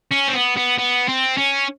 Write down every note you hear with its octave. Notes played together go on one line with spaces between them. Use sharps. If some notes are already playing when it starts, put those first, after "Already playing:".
C#4
C4
B3
B3
B3
C4
C#4